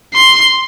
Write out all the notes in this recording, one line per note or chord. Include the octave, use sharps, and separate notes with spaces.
C6